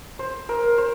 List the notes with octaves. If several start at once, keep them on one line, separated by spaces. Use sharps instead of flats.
C5
A#4
C5